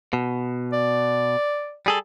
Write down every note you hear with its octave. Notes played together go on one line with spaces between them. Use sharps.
B2
D5
G3 G#4 A4